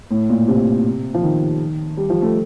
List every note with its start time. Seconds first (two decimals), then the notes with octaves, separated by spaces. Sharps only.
0.11 A2
0.30 A#2
0.48 C3
1.14 F3
1.23 D#3
1.97 G3
2.10 F3
2.22 A3